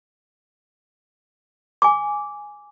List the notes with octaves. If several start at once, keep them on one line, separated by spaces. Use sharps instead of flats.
G#5 D6